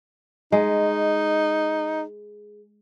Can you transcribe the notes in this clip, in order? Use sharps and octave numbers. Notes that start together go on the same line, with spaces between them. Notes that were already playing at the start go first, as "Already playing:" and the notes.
G#3 D#4